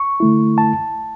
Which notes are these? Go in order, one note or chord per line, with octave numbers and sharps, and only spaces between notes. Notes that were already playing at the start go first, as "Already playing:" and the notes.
Already playing: C#6
D3 A3 E4
A5